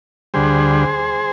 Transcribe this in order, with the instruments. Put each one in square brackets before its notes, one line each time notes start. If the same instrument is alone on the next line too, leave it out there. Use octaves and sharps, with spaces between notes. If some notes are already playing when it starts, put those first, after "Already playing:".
[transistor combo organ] D2 D3 G3 G#4 C5